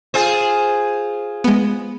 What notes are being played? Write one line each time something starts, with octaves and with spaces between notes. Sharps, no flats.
F4 G#4 C5
G#3 B3